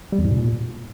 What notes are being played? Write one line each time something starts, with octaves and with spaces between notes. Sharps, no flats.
G3
E2
G#2
B2
A#2